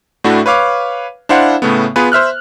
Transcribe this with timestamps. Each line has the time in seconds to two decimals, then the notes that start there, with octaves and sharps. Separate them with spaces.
0.24 A2 A3 D4 E4 F#4
0.46 B4 C#5 F5 D6
1.29 D4 E4 C5 F5 F#5
1.62 A2 C#3 A3 B3
1.96 B3 F4 G#4 B4
2.12 C5 E5 F6 F#6